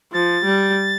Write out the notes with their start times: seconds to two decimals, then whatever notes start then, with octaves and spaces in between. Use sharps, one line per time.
0.13 F3 A6
0.44 G3